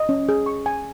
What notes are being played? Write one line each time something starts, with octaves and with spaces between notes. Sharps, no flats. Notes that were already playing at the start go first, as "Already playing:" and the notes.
Already playing: D#5
C#4
G#4
C#6
G#5